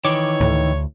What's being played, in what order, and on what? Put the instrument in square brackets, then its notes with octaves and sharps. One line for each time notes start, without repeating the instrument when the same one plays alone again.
[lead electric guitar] D#3 E3 [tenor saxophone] C#5 [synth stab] D6
[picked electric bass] D2 [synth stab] A2